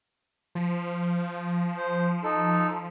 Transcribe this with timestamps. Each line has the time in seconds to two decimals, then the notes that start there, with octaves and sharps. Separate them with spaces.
0.55 F3
1.77 C5
2.24 D#4 A4